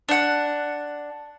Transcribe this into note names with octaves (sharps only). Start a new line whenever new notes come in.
D4 F#5